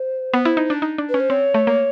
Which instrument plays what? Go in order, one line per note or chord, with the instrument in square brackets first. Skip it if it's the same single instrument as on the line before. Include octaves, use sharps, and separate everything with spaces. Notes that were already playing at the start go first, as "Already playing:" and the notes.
Already playing: [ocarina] C5
[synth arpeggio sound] B3
E4
D#4
D4
D#4
D4
[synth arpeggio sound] C#4 [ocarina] B4
[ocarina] C5
[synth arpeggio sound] C4 [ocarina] C#5
[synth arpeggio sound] A3
A#3